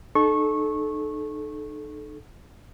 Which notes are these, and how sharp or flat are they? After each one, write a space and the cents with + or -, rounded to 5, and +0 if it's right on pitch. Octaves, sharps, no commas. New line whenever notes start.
D#4 -35 A4 -25 C#6 -20